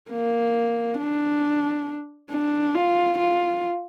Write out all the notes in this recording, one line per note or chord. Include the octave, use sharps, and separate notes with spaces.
A#3
D4
D4
F4
F4